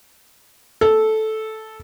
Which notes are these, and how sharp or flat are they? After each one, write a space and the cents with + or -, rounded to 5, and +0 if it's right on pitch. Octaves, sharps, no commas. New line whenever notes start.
A4 -10